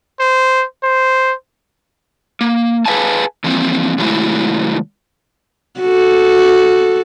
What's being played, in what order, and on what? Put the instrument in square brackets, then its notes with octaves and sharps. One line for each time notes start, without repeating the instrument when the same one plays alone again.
[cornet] C5
C5
[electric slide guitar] A#3
G#4 B4 D#5 F5 G#5 A5
E3 F3 A#3 C4
C3 D#3 F#3 G#3 A3 E4
[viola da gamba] F#4 A4